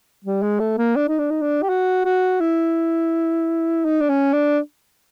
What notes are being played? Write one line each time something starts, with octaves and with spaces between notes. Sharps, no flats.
G3
G#3
A3
A#3
D4
D#4
D4
D#4
D4
G4
F#4
F#4
E4
D#4
D4
C#4
D4